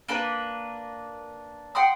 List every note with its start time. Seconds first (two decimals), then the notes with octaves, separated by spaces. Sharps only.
0.08 A#3 D4 B4
1.75 F#5 G5 C6 D#6